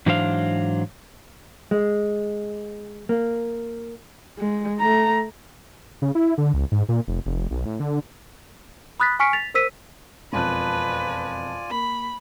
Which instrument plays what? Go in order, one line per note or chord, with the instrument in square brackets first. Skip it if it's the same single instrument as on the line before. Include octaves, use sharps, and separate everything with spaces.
[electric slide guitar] G#2 E3 F#3 D4 C5 F5
[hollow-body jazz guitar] G#3
A#3
[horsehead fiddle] G#3
A3 A#5
[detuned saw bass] C#3
E4
D3
C#2
G#2
A#2
F1
F1
B1
A2
D3
[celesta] B5 D#6 F#6 A6 B6
G#5 C#6 F6 B6 C#7 D7
A6 B6 F7
A#4 C5 E6 B6 D#7
[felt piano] E1 F2 F#6 [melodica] F4 D5 G#5 [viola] B4
[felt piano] A#3 [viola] B5